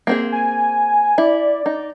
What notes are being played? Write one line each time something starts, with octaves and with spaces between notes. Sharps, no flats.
A#3 C4 G#4
G#5
E4 D5
D#4